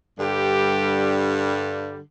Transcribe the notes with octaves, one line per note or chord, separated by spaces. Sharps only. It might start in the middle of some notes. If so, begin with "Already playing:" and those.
G2 D3 G3 G4